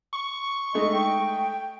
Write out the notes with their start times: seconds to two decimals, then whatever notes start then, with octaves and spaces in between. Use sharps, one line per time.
0.13 C#6
0.74 G#3 A3 D#4 D#5
0.92 G5